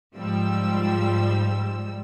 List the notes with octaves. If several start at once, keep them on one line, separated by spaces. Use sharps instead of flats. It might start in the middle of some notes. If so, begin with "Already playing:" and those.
G#2 F3 G3 E6